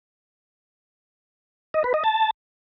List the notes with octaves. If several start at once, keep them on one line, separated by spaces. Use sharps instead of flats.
D#5
B4
D#5
A5